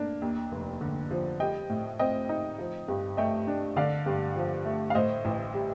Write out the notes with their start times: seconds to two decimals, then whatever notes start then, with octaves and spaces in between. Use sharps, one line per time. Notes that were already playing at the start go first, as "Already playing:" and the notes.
Already playing: A#3 D4
0.22 D#2
0.52 F1
0.81 D3
1.11 F3
1.40 G3 D#5 G5
1.70 A2
1.99 C4 D#5 G5
2.29 D#4
2.58 F3
2.88 G2
3.17 A3 D#5 G5
3.47 D4
3.76 D3 D5 F5
4.06 G2
4.36 F3
4.65 A3
4.90 F5
4.95 A2 C5 D#5
5.25 A1
5.54 G3